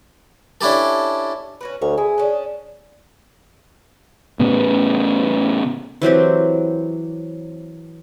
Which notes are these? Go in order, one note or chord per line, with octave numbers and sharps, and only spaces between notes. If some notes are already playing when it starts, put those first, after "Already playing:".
C#4 D4 E4 G4 A4
C#4 F#4 B4
D2 C#5
E4 G#4
C#4 D4
A2 C#3 B3
E3 F#3 C4 G4